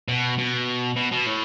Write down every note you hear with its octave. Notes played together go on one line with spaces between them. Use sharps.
B2
B2
B2
B2
A2